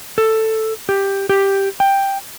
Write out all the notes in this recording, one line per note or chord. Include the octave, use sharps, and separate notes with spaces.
A4
G4
G4
G5